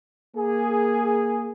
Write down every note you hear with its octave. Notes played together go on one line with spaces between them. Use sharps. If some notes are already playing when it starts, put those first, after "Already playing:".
A#3 G#4